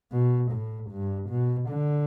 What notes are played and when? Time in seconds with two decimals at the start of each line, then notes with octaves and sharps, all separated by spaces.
0.12 B2
0.52 A2
0.91 G2
1.30 B2
1.69 D3